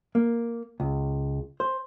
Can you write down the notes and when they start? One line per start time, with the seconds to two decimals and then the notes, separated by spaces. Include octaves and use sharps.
0.15 A#3
0.80 C#2
1.60 C5